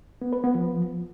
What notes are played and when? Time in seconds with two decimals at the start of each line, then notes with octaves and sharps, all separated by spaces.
0.22 B3
0.33 B4
0.44 B3
0.55 F3